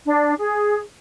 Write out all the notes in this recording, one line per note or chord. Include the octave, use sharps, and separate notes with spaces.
D4
G#4